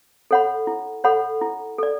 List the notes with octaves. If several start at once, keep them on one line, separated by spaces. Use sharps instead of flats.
A4 C#5 F#5 B5
E4
A4 C#5 F#5 B5
E4
A4 D5